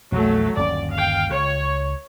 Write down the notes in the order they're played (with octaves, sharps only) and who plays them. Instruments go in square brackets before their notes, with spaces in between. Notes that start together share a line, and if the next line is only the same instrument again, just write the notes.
[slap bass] A#1 E2 [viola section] F#3 A3
[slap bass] G1 D#2 C#4 [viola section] D5
[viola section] F5 G5
[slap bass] C#2 [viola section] C#5